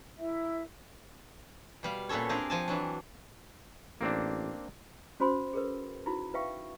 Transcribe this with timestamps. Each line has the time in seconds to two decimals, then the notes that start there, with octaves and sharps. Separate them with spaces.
0.18 E4 A#4 E5
1.83 B2 G3 F5
2.09 A#2 B3 C#4 A4 C#5
2.29 C4 D4 G4 G#4 A#4 F5
2.50 F3 G#5 A5
2.68 E3 F#3 D4
4.01 A1 A#3 C4 D4
5.20 C#4 F#4 C5 B5 C6
5.53 G#4 A#4 B4
6.06 D#4 E4 F#4 B5
6.34 E4 B4 E5 F5 G5 C#6